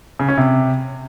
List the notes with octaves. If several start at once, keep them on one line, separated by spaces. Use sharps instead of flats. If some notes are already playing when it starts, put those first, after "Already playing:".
C#3
C#4
C3